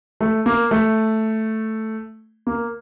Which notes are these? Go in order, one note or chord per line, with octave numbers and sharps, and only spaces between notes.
A3
A#3
A3
A#3